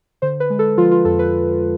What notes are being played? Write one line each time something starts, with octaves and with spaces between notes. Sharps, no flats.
D3 C5
B4
G#3
A4
F3 F4
F4
F2 A4
B4